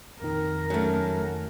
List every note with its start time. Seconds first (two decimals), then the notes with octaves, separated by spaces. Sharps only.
0.21 F2 A#2 D#3 A#4
0.70 F#2 A3